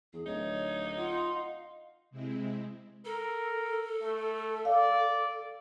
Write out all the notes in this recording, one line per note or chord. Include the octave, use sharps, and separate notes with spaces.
E2 G#4
D1 D#4 C#5
F4 F#5
D#5 F5
C3 G#3 C4 E4
A4 A#4
A3
D5 F5